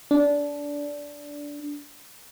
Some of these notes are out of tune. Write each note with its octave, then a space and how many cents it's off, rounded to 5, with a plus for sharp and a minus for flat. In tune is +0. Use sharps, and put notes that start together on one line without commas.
D4 -15